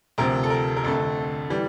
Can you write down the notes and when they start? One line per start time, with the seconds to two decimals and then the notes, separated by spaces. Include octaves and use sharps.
0.18 D2 C3 F3 A#4
0.44 A4
0.50 A#4
0.77 A#4
0.84 F2 D3 A3 A4
1.50 E3 G3